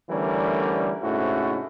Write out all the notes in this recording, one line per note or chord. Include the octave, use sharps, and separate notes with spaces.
D3 E3 G3 A3 C#4 A#4
G#2 C3 A3 C#4 E4 F#4